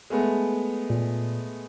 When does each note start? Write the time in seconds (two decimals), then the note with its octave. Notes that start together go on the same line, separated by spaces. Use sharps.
0.10 G#3 A3 B3
0.90 A#2